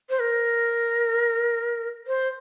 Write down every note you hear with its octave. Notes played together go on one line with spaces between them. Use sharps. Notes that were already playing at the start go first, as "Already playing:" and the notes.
C5
A#4
C5